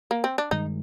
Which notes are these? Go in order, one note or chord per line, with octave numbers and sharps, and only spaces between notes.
A#3
C4
D4
G2 D#3 G#3 D#4